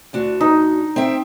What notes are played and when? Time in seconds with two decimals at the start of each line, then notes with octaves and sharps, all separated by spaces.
0.13 D2 D4 F#4
0.41 D#4
0.96 C4 E5 G5